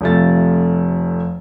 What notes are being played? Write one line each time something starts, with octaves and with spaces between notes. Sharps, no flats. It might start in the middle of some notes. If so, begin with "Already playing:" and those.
F1 F2 C3 A3 F4 A6